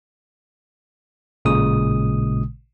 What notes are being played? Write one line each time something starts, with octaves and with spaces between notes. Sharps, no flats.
A1 A#2 C#3 G#3 D#6